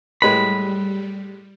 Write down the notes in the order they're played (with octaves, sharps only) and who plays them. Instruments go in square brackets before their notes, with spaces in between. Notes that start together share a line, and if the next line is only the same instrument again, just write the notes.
[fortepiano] A2 G#3 B4 [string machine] G3 [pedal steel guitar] B5